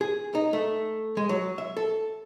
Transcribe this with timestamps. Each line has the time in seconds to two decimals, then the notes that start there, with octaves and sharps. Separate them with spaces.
0.01 G#4
0.35 D#4
0.53 A3
1.17 G#3
1.29 F#3
1.58 E5
1.77 A4